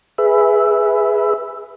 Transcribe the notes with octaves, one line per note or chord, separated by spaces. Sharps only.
G#4 B4 E5